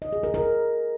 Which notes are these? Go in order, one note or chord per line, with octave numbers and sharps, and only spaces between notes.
D#5
G#4
A#4
A#4